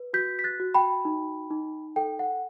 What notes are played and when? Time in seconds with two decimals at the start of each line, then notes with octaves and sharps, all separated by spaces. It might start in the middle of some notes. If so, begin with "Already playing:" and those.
Already playing: B4
0.13 F#4 G6 B6
0.39 B6
0.44 F#6 A6
0.60 F#4
0.74 G5 B5
1.05 D#4
1.51 D#4
1.96 A4 G5
2.19 F#5